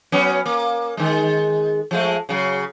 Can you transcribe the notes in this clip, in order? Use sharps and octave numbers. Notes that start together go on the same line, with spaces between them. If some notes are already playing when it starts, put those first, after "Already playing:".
F#3 B3 C#4
A#3
D#3 G#3
F3 G#3 A3
C#3 F#3